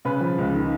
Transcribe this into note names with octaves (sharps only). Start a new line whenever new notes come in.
C#3 B4
F3
C#2
D#3